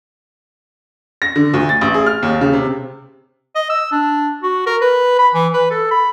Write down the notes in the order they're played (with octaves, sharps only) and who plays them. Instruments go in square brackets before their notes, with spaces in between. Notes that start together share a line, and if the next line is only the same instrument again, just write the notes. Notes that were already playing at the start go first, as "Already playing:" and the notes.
[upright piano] A#6
D3
D2
A6
A1
G#4
F6
D#2
C#3
C3
[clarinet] D#5
E6
D4
F#4
A#4
B4
B5
E3
B4
A4
B5